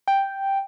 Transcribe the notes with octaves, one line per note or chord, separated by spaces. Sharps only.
G5